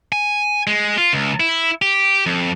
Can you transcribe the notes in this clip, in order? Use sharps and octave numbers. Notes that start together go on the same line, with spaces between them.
G#5
G#3
F4
C#2
E4
G4
F2